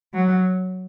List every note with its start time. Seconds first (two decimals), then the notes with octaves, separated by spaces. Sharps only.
0.13 F#3